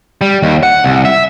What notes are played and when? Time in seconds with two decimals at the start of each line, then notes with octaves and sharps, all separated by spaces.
0.21 G3
0.43 D#2
0.63 F#5
0.84 C2
1.05 E5